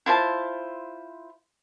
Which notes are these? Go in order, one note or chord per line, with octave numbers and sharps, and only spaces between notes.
E4 F4 C5 A5